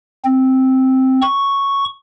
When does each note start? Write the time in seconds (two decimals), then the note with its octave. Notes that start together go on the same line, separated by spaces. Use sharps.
0.25 C4
1.22 C#6